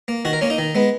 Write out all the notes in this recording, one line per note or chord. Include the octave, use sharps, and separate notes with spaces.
A#3
D#3 F#4
A#4
A#3 C#4
D#4
D#3
G#3 B3